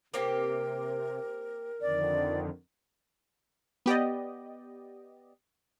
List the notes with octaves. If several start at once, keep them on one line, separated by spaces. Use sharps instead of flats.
C3 A#3 C4 G4 A#4
F2 D3 D#3 D5
B3 G4 D5 D#5